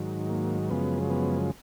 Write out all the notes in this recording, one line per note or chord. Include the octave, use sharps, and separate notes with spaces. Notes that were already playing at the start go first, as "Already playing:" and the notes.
Already playing: G#2 D#3 F#3
A#3
F#2 C#3 F3 G#3 B3
B3